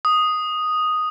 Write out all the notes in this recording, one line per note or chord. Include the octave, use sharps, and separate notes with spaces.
D#6